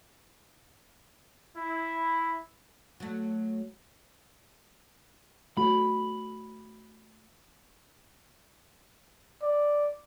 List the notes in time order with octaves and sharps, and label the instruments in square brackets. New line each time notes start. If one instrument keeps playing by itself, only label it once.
[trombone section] E4
[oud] F#3 A3
[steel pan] A3 F#4 [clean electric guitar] B5
[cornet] D5